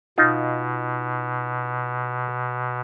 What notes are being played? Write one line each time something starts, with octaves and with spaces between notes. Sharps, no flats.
B2 D#4 F4